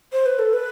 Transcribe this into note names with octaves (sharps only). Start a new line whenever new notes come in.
C5
B4
A4
B4